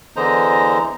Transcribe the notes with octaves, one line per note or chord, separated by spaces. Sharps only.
E2 D3 E3 C5 D#5 A#5